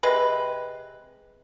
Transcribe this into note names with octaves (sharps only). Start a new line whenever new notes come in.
C3 G#3 B4